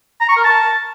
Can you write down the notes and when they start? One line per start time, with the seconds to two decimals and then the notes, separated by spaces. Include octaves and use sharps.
0.21 A#5
0.29 C#6
0.36 A#4
0.44 A5